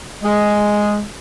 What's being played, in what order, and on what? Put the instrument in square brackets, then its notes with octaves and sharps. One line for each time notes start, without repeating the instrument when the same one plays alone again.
[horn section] G#3